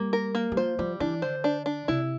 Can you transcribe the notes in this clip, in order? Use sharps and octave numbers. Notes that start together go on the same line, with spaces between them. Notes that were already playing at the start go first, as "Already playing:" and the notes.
Already playing: G3 A#3
A#4
A#3
G3
F3 C5
F3 G3
E3 D4
D3 C5
D4
D4
C3 E4